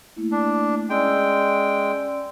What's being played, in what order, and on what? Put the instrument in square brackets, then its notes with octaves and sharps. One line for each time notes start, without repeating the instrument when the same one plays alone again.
[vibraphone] A3 A#3 E4
[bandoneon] D4
[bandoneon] G#3 G5 [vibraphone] C#4 D5 E6